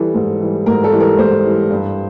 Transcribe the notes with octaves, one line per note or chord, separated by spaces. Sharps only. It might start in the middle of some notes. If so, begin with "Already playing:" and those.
Already playing: E3 G3 A4
G#2
E3 G3
G#2 A#4
A4
E3 G3
A#4
G#2 C5
E3 G3
G2